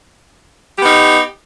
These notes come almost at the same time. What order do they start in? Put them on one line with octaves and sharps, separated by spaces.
G4 B3 D#4